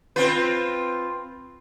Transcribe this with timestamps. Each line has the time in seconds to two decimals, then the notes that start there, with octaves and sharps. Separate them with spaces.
0.16 C4 F4 B4